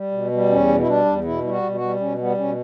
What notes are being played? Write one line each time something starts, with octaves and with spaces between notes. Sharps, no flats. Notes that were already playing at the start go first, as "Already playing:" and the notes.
Already playing: G3
B2
G3
E2 C#4
B2
E4
G3 D4
E2
B2 E4
G3 E4
F#4
B2
F#4
G3
B2 C#4
G3 B3
B2 C#4